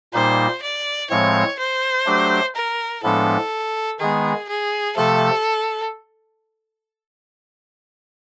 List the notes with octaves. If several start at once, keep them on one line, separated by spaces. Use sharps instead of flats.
A#2 G3 A#3 D#4 C5
D5
A2 F3 G#3 C4 C#5
C5
F#3 A3 D4 G4
A#4
A2 F3 G#3 B3 D4 A4
D#3 G#3 B3 G#4
G#4
C3 F3 A3 A4